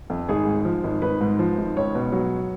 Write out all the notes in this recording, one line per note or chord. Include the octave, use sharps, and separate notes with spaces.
F2
G#1 G#4
G#2
F3
G#1
G#1 B4
G#2
F3
G#1
C#2 C#5
B2
F#3